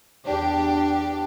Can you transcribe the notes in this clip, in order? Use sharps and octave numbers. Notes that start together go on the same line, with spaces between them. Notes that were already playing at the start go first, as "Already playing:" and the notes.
E2 D4 G4